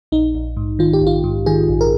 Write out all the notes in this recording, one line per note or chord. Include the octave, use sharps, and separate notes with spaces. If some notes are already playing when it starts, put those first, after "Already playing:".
A#1 D#4
A#1
G#2
D#3 F4
G4
A#1 F4
G#2
D#3 G#4
A#1
A#4